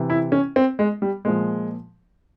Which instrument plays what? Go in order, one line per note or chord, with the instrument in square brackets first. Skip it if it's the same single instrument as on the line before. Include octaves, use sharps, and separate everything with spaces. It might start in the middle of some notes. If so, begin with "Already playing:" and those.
Already playing: [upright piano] C3 E3
E4
C#4
C4
G#3
G3
A#2 F3 G#3